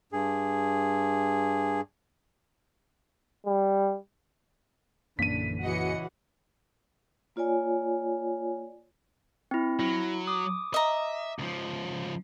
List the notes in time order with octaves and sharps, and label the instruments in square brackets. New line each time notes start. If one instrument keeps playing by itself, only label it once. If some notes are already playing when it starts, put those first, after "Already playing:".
[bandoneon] G2 G#4
[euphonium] G3
[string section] A#1 D3 E3 [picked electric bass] F#2 A#3 C#4 [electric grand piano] B6 D#7
[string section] C#3 D#5 C#7 [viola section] E3 F#4 F#5
[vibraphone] A#3 F4 C#5 D5 G#5
[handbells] C4 E4
[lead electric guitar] F#3 [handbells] E4
[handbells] D6 D#6
[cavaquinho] D#5 A#5 [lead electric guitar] E5
[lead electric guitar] C#2 F3